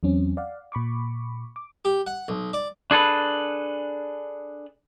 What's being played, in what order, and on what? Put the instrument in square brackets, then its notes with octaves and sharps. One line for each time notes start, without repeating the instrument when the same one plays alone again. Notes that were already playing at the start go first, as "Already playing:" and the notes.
[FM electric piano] E2 F#3 C4 C#4
D5 F5 F#5
A#2 B5 C#6 D6
D6
[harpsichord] G4
F#5
B1
D5
[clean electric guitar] D4 G#4 A4 B4